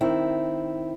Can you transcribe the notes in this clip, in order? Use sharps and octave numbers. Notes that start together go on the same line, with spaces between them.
D#3 C4 E4